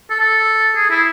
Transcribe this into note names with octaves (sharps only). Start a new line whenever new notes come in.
A4
A4
G#4
E4